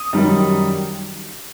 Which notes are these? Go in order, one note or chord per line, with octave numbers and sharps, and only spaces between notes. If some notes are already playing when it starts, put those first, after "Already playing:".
Already playing: D#6
F#2 D#3 G3 D#4